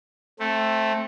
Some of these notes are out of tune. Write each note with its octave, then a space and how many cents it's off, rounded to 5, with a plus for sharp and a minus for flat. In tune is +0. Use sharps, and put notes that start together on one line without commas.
A3 +0 C4 +20